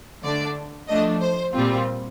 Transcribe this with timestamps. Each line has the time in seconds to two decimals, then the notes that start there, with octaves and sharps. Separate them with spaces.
0.23 D3 A3 D4 D5
0.88 F3 A3 D4 D#5
1.21 C5
1.54 A#2 G3 C4 F4